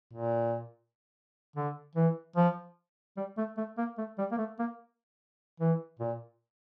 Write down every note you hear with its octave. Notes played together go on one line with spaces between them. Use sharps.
A#2
D3
E3
F3
G3
A3
A3
A#3
A3
G3
A#3
A3
A#3
E3
A#2